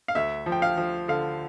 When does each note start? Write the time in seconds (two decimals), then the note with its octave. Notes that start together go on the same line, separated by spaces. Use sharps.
0.08 F5
0.15 D2 E5
0.46 F3
0.52 G5
0.62 F5
0.77 F3
1.08 D3 F5